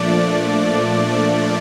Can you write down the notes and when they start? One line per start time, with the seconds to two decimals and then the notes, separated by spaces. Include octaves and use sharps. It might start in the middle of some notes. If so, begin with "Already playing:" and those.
Already playing: A#2 F3 A3 D4 D5